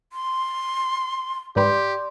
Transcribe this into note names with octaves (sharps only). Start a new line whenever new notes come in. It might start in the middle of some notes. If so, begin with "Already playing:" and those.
C6
G#2 G4 B4 D5 G5 C6